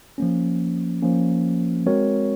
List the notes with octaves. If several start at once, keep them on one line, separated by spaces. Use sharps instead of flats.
F3 A#3 C#4
F3 A#3 C#4
G#3 C4 F#4 A#4 C#5